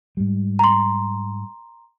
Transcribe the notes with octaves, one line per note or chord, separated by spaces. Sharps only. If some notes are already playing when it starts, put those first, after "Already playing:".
G#2 G3
A#5 C6